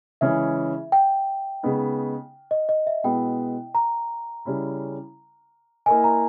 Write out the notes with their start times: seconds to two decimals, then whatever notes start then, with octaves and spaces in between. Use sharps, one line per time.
0.21 C#3 E3 G#3 C#4 G#4 E5
0.92 G5
1.63 C#3 G#3 B3 D#4
2.51 D#5
2.69 D#5
2.87 E5
3.04 B2 G#3 B3 E4 G5
3.75 A#5
4.45 C#3 G3 C#4 E4
5.86 A#3 E4 A#4 D#5 G#5
6.04 A#5